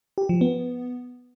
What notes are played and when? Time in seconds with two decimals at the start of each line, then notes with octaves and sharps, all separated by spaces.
0.18 G4
0.29 F3
0.41 B3